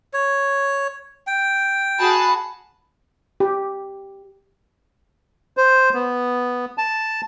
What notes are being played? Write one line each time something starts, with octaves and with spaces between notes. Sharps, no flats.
C#5
G5
F#4 G#4 A5 B5
G4
C5
B3
A5